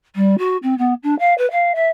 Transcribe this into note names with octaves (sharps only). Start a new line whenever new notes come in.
G3
F#4
C4
B3
D4
F5
B4
F5
E5